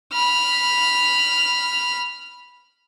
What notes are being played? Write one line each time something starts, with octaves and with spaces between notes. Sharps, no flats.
B5 F6